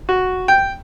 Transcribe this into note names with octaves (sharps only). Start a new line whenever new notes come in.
F#4
G5